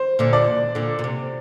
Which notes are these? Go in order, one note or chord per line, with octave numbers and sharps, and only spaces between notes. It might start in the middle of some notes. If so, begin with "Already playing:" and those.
Already playing: C5
A#2 D3
D5
A#2 D3
A#2
C3